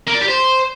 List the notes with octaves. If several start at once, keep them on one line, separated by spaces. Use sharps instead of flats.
A#3
D5
G4
C5